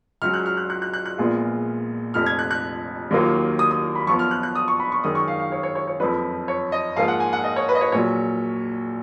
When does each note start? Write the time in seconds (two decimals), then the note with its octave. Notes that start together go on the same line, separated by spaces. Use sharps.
0.22 C#2 C#3 F#3 F6
0.34 F#6
0.46 F6
0.57 F#6
0.70 F#6
0.82 F#6
0.93 F#6
1.06 F#6
1.18 A#1 A#2 G#3 B3 F4
2.14 F1 F2 F3 F6
2.26 G#6
2.39 F#6
2.51 F#6
3.11 D#2 D#3 F#3 A#3 F4
3.59 D#6
3.71 D#6
3.96 B5
4.07 F#2 F3 B3 F4 C#6
4.19 F6
4.31 F#6
4.43 F#6
4.55 D#6
4.68 C#6
4.80 B5
4.92 C#6
5.04 F#2 D#3 G#3 D#6
5.15 C#6
5.28 F5
5.39 F5
5.52 C#5
5.63 C#5
5.75 C#5
5.88 C#5
6.00 F#1 F2 F3 B4
6.48 C#5
6.72 D#5
6.96 G#2 F3 A#3 F4 F5
7.08 F#5
7.20 G#5
7.33 F#5
7.44 D#5
7.56 C#5
7.69 B4
7.75 D#5
7.81 C#5
7.92 A#1 A#2 F#3 C#5